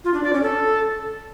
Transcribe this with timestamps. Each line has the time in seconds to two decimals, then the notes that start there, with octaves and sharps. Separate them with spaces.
0.04 F4
0.14 D4
0.24 D5
0.33 C#4
0.43 A4